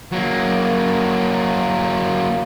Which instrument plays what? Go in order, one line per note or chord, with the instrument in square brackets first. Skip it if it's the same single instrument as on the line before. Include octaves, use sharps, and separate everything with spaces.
[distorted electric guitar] F#3 A#3